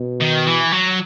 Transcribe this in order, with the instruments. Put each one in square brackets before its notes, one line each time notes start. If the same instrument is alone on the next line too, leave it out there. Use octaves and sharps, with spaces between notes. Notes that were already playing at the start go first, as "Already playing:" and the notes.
Already playing: [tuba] B2
[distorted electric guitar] D#3
E3
F#3